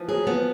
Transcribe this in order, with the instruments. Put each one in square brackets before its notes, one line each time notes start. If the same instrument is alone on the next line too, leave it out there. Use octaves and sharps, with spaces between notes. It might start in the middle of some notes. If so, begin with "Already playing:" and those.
Already playing: [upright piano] E3 F3
[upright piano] F#3 [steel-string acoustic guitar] G#4
[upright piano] F3 [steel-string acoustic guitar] B3